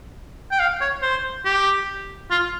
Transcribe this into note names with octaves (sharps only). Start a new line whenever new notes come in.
G5
F5
C#5
C5
G4
F4